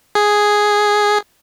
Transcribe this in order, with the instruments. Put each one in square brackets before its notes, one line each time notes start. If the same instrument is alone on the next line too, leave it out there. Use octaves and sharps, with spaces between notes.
[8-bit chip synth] G#4